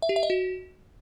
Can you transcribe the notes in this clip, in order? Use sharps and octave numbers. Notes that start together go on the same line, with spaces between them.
E5
G4
E5
D#5
F#4